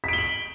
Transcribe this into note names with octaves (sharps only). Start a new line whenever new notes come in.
B6 D7 F#7 G7